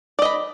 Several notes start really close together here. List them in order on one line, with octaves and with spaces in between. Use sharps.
D5 D#5 B5